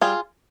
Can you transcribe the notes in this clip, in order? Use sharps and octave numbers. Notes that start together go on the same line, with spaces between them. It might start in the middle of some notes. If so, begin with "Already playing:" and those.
G3 F4 G#4